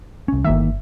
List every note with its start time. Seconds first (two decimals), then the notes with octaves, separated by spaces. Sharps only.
0.28 C2 C#4
0.45 G1 D#3 A#3 E5